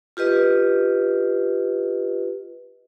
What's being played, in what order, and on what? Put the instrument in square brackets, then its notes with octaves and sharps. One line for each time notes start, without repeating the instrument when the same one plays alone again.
[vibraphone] F4 G4 B4 D#5